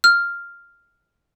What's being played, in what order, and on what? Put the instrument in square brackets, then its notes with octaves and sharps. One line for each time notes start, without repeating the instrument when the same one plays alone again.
[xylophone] F6